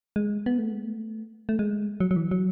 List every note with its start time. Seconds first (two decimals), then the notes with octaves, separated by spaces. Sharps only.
0.16 G#3
0.46 B3
0.58 A3
0.72 G#3
0.84 A3
1.49 A3
1.59 G#3
2.00 F#3
2.11 F#3
2.16 E3
2.31 F#3